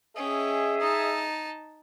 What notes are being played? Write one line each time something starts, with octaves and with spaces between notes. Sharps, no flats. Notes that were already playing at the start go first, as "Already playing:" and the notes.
C#4 G#4 D#5 E5 G5
D#4 A5